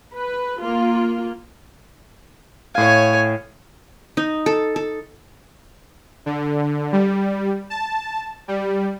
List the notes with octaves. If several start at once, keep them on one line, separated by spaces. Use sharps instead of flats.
B4
A#3 F4
A2 C#5 F5 G#5
D#4
A4
A4
D3
G3
A5
G3